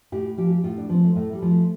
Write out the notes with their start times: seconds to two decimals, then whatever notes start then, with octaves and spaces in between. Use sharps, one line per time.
0.12 A2 G4
0.38 F3 G4
0.51 G4
0.64 A2 F4
0.78 D4
0.89 F3
0.94 C4
1.03 A3
1.16 A2 A3
1.33 G3
1.42 F3
1.50 A3